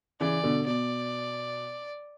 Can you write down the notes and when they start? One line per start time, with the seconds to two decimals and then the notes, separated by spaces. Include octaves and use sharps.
0.20 C#3 E3 D5
0.43 B2 D3
0.66 B2 D5